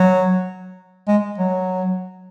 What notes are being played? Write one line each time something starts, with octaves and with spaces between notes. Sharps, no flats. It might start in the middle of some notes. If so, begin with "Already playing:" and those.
Already playing: F#3
G#3
F#3